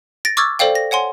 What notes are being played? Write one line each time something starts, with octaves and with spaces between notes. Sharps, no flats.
A6 A#6 D7
C#6 D6 E6 F6 G#6 A6
A4 C5 D5 F5 G5
A#6
C#5 F#5 G#5 C6